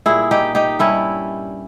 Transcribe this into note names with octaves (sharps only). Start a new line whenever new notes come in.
A#2 G3 E4 G#4
D#4 G4
D#4 G4
G2 G3 C#4 E4